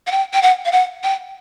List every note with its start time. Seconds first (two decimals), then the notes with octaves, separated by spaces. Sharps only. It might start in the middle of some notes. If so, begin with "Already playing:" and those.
0.07 F#5
0.11 G5
0.34 G5
0.42 F#5
0.65 F5
0.72 F#5
1.03 G5